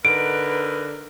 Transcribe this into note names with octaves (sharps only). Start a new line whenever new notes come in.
D3 D#4 A#4 B4 D7